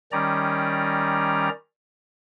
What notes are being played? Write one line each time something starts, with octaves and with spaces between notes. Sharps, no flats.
D#3 G3 C#4 D5 A#5